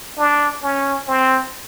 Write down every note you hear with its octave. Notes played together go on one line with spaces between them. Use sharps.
D4
C#4
C4